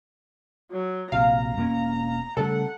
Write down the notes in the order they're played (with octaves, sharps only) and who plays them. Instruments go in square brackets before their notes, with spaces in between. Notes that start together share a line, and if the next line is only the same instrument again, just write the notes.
[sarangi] F#3
[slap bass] A#1 C3 [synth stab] F5 [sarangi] A#5
[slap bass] E1 A#3 C#4
[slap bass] C#3 G3 A3 [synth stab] A4 [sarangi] F#5